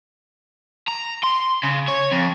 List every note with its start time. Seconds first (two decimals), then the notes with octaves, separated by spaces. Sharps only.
0.88 A#5
1.24 C6
1.63 C#3
1.88 C#5
2.12 F2